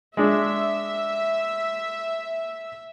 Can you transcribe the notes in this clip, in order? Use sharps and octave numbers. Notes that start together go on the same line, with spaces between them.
G#3 D4 E5